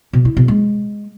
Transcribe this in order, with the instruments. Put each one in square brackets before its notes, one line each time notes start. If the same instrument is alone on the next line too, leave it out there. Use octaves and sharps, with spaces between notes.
[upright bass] B2
E4
B2
G#3